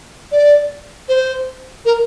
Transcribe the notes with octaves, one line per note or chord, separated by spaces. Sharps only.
D5
C5
A#4